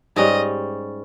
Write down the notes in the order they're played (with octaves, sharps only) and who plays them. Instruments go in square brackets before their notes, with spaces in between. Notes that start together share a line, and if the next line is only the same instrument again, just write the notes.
[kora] G#2 G3 C#4 [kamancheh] D#5